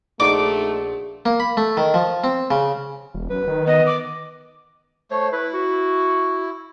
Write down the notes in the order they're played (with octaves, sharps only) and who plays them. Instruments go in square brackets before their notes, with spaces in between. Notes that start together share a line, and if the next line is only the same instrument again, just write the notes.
[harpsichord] A#1 F#4 C5 [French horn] A3 [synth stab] D#4 D5 [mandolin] D6
[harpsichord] A#3
B5
A3
D#3
F3
C4
C#3
[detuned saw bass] E1
[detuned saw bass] F#2 [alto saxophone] B4
[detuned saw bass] D#3
[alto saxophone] B3 [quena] D#5
[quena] D6
[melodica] A3 C#5 [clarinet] C5
[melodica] E4 [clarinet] B4
[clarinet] F#4